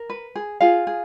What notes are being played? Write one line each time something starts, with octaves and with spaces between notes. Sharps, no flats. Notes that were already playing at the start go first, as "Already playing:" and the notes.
Already playing: A#4
B4
G#4
F4 G#4 F5
G#4